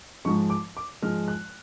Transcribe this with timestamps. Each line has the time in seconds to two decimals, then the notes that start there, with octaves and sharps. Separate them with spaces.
0.25 G#2 F3 G#3 C#6
0.50 D6
0.77 D6
1.02 G#2 F3 G#3 F6
1.28 F#6